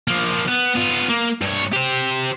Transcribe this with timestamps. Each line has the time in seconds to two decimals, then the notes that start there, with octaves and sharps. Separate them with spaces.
0.08 F3 A#3
0.49 B3
0.76 B3 F4
1.10 A#3
1.41 G2 C#5
1.72 G4 C5